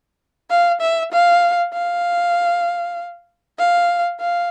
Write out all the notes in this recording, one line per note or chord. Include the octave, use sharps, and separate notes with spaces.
F5
E5
F5
F5
F5
F5